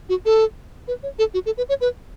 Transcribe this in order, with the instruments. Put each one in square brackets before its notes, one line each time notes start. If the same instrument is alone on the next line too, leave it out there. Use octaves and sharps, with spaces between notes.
[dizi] F#4
A4
B4
C#5
A4
F#4
A4
B4
C#5
B4